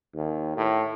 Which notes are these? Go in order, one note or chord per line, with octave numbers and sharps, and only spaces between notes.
D#2
A2